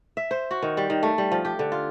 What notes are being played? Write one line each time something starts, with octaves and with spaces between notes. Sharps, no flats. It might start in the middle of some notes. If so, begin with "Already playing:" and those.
E5
C5
F#4
D#3
G3
D#3
A3
G3
F3
G4
D3
F4